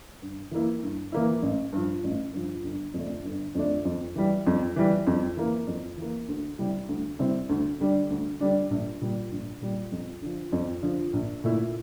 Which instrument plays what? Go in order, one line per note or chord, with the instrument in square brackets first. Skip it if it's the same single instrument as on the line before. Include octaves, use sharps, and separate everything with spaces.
[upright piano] G2
E3 A#3 E4
G2
E3 A#3 E4
A1
G2 F3
A1
G2 F3
G1
F2 D3 A3 D4
G1
F2 D3 A3 D4
F2
E3 G3
F2
E3 G3
F2
E3 A#3
F2
E3 A#3
D2
C3 G3 C4 E4
D2
C3 G3 C4 E4
D2
D3 G3 D4
D2
D3 G3 D4
A#1
A#2 G3
A#1
A#2 G3
F2
D3 F3
F2
D3 F3
A#1
A#2 A3 E4